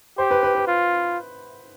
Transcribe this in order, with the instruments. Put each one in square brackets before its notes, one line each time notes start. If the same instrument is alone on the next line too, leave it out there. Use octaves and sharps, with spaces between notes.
[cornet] G4 [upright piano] C5
[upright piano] B4
B4
B4
[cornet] F4